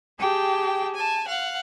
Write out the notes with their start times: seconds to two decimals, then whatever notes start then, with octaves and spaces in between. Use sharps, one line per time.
0.19 G4 G#4 G5 A5
0.93 G#5 A5
1.27 F5 F#5